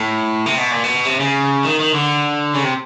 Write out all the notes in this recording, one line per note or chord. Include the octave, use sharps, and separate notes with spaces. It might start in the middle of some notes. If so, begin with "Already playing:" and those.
Already playing: A2
C3
B2
A#2
B2
C3
C#3
D#3
D#3
D3
C#3
C3